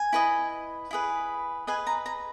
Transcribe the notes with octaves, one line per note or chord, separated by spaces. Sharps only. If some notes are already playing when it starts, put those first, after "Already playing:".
Already playing: G#5
E4 B4 D#5
E4 G#4 B4
G#4 B4 D#5 G#5
A#5
A#5